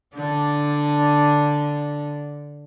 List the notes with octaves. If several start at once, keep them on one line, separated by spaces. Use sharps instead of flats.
D3 D4